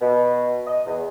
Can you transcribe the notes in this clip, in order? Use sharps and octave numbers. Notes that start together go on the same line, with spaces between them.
B2
D#5
E2